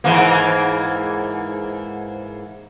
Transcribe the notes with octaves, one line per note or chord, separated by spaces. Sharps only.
G#2 E3 A#3